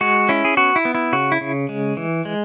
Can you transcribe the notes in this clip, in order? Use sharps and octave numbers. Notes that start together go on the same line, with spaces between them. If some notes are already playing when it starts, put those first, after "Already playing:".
G#3 F#4
C#4 E4
G#4
B3 F#4
E4
B3
E4
C#3 F#4
E4
C#3
G#3
E3
G#3